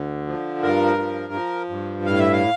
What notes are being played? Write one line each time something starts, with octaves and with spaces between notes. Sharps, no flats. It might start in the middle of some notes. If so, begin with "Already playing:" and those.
Already playing: D2 D3
F3
G2 A#4
F3
F3
G2
A2 F5
E5
F5